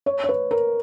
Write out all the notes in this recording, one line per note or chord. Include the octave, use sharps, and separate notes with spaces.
C#5
C#5
B4
A#4